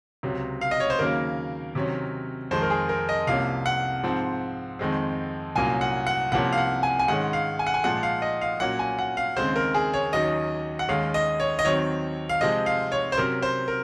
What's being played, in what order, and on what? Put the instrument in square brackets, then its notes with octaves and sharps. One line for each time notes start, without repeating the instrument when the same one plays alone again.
[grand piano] C#2 C3 F#3
F5
D#5
C#5
C5
D#2 C#3 F#3 A#3 A#4
C3 D#3 F#3 C#4
F2 D#3 G#3 C5
A#4
G#4
A#4
D#5
C2 C3 F3 A#3 C#4 F5
F#5
G#2 F3 C4
F2 D#3 G#3 C4
C2 A#2 F#3 A#3 C#4 G#5
F#5
F#5
C2 C3 F3 A#3 C#4 F#5
F5
F#5
G#5
G#5
G#2 D#3 G#3 C#4 F#5
F5
G#5
F#5
G#5
A#2 F3 G#3 F#5
F5
D#5
F5
A#2 F#3 A#3 C#4 F#5
G#5
F#5
F5
D#2 C#3 G#3 C4 C5
A#4
G#4
C#5
D#2 D#3 F#3 C#4 D#5
F#5
D#2 D#3 G#3 C#4 F5
D#5
C#5
D#5
D#2 D#3 F#3 C4 C#5
F5
C3 F3 G#3 C4 D#5
F5
C#5
C5
C3 F#3 C#4 A#4
C5
A#4